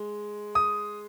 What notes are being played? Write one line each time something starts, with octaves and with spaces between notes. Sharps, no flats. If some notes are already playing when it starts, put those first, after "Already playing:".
Already playing: G#3
D#6